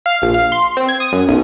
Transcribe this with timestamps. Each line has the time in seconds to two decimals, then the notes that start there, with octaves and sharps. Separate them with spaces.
0.06 F5
0.22 A#1
0.34 F5
0.52 C6
0.77 C4
0.89 G#6
1.00 D#6
1.13 F#2
1.28 B1